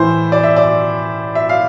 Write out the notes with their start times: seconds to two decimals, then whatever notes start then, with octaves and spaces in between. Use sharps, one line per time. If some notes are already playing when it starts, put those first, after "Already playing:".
Already playing: A2 E3 C5
0.32 D5
0.43 E5
0.56 D5
1.35 E5
1.49 F5